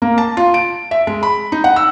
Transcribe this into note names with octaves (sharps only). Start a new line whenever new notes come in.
A#3
A5
F4
D7
E5
G#3
B5
D#4
F#5
E6